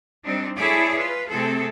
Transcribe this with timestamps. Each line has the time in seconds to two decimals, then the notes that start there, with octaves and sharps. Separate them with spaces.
0.24 G3 C4 D4 D#4
0.58 E4 G#4 A4 C#5 D5 E5
0.98 F4 B4
1.29 C3 A3 C4 G#4 A4